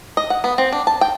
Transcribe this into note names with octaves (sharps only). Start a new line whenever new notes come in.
D#5
F#5
B3
C4
D4
A5
G5